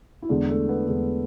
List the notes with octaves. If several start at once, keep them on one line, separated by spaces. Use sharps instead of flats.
E4
E2 D3 G#3 D4
A3
B3
E2 D3 G#3